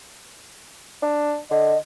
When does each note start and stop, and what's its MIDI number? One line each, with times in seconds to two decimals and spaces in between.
1.02 1.38 62
1.51 1.74 50
1.51 1.77 75